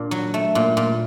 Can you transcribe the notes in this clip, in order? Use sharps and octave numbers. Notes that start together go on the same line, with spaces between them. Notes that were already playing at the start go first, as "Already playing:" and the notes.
Already playing: A#2 D4
F#3
A3
A#2
A#2